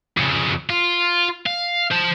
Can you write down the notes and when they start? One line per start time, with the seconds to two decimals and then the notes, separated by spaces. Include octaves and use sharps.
0.17 F2 C#3
0.70 F4
1.46 F5
1.91 C5 A5